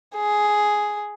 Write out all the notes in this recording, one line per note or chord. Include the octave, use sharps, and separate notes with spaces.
G#4